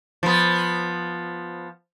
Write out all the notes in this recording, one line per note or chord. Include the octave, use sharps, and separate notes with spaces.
F3 B3